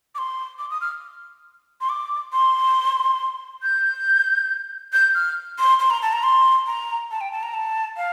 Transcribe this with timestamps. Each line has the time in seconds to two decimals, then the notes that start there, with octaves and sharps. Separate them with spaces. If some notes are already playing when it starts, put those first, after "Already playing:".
0.15 D6
0.18 C6
0.59 D6
0.70 D#6
0.81 F6
1.81 C6
1.89 D6
2.33 C6
3.63 G6
4.93 G6
5.15 F6
5.59 C6
5.79 C6
5.90 A#5
6.02 A5
6.13 A#5
6.23 C6
6.67 A#5
7.11 A5
7.21 G5
7.32 A5
7.43 A#5
7.54 A5
7.97 F5